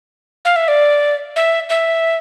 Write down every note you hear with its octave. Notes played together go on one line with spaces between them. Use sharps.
F5
E5
D5
E5
E5